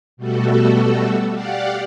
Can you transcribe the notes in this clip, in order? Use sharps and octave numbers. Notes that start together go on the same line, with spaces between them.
B2 G3 A3 F#4 A4
G4 D5 F5 F#5